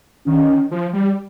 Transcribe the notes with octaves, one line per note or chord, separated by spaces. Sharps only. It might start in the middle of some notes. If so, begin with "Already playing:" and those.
D#3 C#4
F3
G3